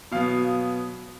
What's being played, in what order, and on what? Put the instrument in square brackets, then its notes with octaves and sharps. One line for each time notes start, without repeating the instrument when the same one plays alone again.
[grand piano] B2 F#3 B3 F5